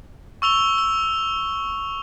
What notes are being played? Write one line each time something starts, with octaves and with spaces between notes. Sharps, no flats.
C#6 E6 F7 G7
E6